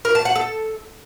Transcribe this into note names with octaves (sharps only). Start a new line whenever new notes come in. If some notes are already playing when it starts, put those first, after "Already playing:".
A#4
A5
F#5
A4